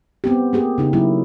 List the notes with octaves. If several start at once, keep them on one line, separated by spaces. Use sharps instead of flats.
B3 C4 G4
A#3 G4 G#4
C#3 D#4 G4
F#3 A#3 E4